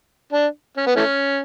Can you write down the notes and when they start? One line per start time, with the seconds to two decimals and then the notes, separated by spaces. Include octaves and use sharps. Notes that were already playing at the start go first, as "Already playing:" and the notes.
0.33 D4
0.78 C#4
0.87 B3
0.96 E3 A3 C#4